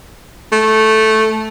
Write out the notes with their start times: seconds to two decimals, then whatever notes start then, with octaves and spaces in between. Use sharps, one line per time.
0.52 A3